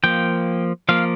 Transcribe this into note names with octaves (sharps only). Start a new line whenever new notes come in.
F3 A#3 G5
F3 A#3 F5